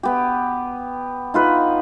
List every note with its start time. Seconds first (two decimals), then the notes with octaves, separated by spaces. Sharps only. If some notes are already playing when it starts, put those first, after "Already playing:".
0.03 B3 G4
1.34 D#4 F4 B4